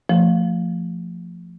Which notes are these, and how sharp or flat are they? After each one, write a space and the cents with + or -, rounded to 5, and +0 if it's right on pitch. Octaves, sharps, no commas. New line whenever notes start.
F3 +0 A3 +30